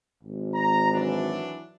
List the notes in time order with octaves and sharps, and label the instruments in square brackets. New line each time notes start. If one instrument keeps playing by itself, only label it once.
[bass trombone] G#1
[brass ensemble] A#5
E3 F#3 D4